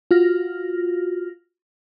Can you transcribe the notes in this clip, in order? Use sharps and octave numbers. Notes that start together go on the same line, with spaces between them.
F4 F#4 F6 A#6